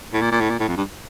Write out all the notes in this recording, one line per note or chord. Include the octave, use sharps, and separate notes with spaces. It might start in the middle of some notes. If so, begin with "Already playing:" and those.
A2
A#2
A#2
A2
A#2
A2
F2
G2